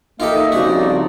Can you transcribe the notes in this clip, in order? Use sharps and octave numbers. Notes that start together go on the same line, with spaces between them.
A#3 D#4 F4 G4 A4 D#5 E5
C2 C#3 F3 F#4 D5